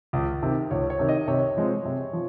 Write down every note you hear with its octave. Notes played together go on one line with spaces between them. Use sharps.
C#2
C3 D#3
C#2 C#5
C#5
C3 D#3
D#5
C3 C#5
F3 G#3 C4
C3
F3